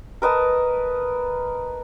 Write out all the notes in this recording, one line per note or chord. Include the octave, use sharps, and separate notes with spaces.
A#4 B4 D#5 A5